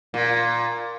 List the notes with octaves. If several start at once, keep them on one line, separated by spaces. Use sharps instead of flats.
A#2